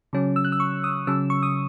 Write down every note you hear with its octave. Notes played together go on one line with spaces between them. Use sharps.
C#3 F#3 C#4
E6
F#6
E6
C#6
D#6
C#3 F#3 C#4 E6
C#6
D#6